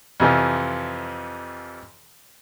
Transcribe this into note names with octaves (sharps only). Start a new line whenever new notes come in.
F2 C3 E3 F3